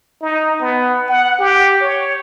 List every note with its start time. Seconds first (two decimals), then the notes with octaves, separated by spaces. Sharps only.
0.21 D#4
0.61 B3
1.09 F#5
1.39 G4
1.81 C#5